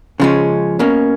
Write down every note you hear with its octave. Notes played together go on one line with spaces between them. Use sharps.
C#3 F3 G#3 C#4
B2 A#3 C#4